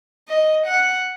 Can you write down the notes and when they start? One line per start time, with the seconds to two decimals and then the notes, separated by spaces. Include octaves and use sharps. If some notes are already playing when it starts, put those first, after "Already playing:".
0.28 D#5
0.66 F#5